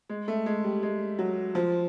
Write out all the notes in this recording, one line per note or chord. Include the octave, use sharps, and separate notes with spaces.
G#3
A3
G#3
G3
G#3
F#3
F3